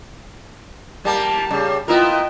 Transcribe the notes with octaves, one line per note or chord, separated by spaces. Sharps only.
G3 A#3 A5
C#3 G3
B3 E4 F4 A#4 D#5 G5